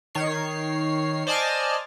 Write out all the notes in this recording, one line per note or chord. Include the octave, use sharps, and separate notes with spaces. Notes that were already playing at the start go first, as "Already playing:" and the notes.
D#3 C#5 C7
C5 D5 D#5 G#5 A5 F6